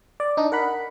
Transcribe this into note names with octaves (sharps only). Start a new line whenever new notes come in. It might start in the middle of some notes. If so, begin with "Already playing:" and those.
D5
D4 D#4
A#4 F#5 B5